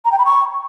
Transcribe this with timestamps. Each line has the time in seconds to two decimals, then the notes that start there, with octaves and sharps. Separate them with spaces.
0.05 A#5
0.12 G5
0.19 B5
0.25 C#6